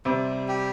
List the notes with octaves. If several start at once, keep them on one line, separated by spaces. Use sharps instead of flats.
C3 G3 C4
G4